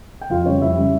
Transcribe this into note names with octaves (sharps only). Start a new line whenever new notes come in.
G5
F2 F4 F5
C#3 G3 C#5
F2 E4 E5
C#3 G3